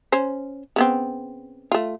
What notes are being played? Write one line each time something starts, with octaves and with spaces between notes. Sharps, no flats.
C#4 C5
C#3 B3 C4
A3 F4